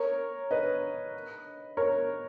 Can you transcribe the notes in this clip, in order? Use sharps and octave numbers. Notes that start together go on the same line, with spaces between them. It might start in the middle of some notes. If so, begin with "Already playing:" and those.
Already playing: A#4 C#5
B4 D#5
A#4 C#5